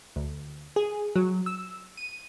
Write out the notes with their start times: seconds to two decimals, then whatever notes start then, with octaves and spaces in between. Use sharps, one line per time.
0.16 D2
0.76 G#4
1.16 F#3
1.46 E6
1.97 D#7